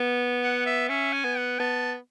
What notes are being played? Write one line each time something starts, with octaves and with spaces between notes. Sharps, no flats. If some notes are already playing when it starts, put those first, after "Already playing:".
Already playing: B3
F#5
E5
C#4 E5
G#5
B3
F#5
B3 A5